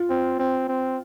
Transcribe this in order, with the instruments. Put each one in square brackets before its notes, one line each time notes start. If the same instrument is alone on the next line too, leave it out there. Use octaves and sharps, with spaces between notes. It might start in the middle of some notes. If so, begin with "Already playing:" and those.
Already playing: [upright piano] F4
[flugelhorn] C4
C4
C4